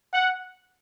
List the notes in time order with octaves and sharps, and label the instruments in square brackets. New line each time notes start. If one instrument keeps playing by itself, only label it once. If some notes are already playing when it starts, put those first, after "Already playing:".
[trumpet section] F#5